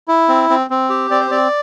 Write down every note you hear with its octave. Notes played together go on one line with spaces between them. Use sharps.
E4
C4
C4
C4
G4
C4 D5
C5
C4 D5